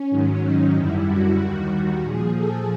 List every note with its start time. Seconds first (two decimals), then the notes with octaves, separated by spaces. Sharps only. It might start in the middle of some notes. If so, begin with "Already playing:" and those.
Already playing: C#4
0.10 G#2 D#3 F#3
0.42 D#4
0.74 F#2 D3 G3 E4
1.06 F#4
1.38 D#2 D#3 G3
2.02 A#2 F3 G#4
2.34 A4